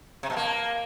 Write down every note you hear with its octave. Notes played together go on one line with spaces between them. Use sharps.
C3
B2
A#3